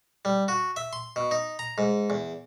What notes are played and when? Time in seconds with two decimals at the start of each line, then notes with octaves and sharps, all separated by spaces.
0.25 G3
0.48 F#4
0.76 E5
0.93 C6
1.16 B2
1.31 D#4
1.59 A#5
1.78 G#2
2.10 E2